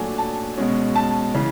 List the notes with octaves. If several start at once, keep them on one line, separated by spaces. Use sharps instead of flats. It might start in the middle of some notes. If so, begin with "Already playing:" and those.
Already playing: A#2 F#3 A3 D4 G#5
A5
B2 G#3 C#4
A5
C#3 E3